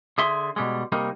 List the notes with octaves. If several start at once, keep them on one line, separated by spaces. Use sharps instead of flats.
D3 G#4 E5 C6
B2 G3 G#3
C3 G3 A#3 D#4